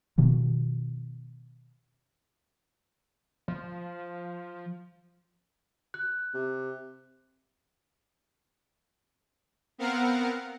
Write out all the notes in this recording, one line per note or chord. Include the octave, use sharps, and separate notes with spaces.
B2 D#3 F3
F3
F#6
C3
B3 C4 A#4 F5 F#5